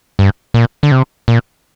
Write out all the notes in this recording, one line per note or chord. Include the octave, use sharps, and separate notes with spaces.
G2
A#2
D3
C3
A#2